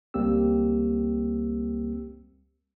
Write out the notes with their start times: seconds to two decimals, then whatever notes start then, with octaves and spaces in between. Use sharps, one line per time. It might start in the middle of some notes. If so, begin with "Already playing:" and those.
0.14 C#2 G3 A#3 C4 G4 E6